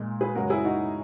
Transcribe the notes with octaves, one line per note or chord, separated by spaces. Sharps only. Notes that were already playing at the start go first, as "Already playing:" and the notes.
Already playing: A#2 G#3
G#4 B4
F#2 C#3 G#3 F#4 A#4
E4 G#4
D#4 F#4